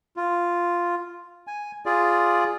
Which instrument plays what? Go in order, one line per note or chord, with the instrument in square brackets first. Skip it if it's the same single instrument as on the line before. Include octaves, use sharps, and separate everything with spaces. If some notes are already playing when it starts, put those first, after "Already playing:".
[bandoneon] F4
G#5
F4 G#4 D5